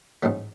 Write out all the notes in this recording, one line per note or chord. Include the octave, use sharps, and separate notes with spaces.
A1 G#2 F#3 A3